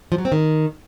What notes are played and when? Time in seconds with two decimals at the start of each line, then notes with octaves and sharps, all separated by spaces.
0.12 F3
0.18 F#3
0.25 C4
0.32 D#3